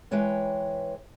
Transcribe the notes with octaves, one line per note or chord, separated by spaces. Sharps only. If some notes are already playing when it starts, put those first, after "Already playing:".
E3 G#3 B4 C#5 G5